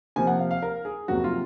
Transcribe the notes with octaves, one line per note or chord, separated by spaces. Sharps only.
C3 F3 A#3 G#5
F#5
F5
F5
A#4
G#4
F2 C3 F#3 A#3 F#4
F4